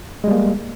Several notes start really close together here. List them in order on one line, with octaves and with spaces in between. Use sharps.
G#3 G3 A#3